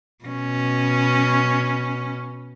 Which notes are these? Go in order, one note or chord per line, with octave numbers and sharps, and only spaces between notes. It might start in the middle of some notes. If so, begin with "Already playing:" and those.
B2 C#4